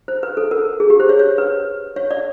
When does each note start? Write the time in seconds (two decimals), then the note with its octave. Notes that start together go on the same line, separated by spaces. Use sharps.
0.08 C5
0.23 B4
0.37 A4
0.51 A#4
0.80 G#4
0.90 G4
1.00 C5
1.09 C#5
1.19 C#5
1.38 B4
1.96 C#5
2.11 D5